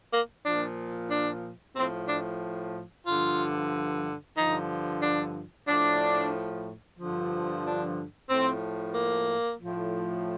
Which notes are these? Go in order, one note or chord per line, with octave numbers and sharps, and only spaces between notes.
A#3
A#2 F3 D4
D4
A2 F3 C4
D4
G2 D3 F3 F4
G2 D3 F3 D#4
D4
A2 F3 D4
G2 D3 F3
D4
A2 F3 C4
A#3
A2 F3